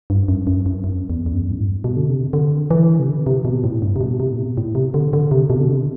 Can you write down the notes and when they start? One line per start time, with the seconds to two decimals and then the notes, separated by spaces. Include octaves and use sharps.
0.10 G2
0.28 F#2
0.47 F#2
0.66 F#2
0.84 F#2
1.10 E2
1.26 E2
1.34 F#2
1.50 A2
1.59 G2
1.84 B2
1.97 D3
2.09 C3
2.33 D3
2.71 E3
2.99 C3
3.08 D3
3.27 C3
3.45 B2
3.64 A2
3.82 G2
3.96 C3
4.01 B2
4.20 C3
4.32 A2
4.38 B2
4.57 A2
4.75 C3
4.94 D3
5.13 D3
5.31 C3
5.50 B2
5.60 D3
5.69 C3